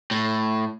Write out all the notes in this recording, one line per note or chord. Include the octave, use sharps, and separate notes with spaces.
A2